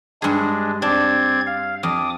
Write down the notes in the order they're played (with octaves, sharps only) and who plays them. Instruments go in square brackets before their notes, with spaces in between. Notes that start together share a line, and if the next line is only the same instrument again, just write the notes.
[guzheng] G2 G#4 [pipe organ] G#3 D4
[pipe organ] C4 D5 G#6 [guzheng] D4
[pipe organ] F5
[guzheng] F2 [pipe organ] D6 D#6